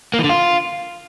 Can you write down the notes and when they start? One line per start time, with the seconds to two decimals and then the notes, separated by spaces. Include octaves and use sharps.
0.14 A#3
0.19 E3
0.24 D3
0.29 F4